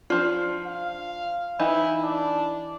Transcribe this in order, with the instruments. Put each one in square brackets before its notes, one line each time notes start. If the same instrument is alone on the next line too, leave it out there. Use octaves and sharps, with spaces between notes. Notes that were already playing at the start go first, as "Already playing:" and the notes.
[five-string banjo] F3 D4 [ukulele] F4
[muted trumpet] F5
[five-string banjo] E3 D#4 [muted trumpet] E4
[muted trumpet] D4